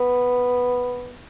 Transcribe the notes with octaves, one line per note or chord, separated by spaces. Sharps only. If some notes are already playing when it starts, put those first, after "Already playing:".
Already playing: B3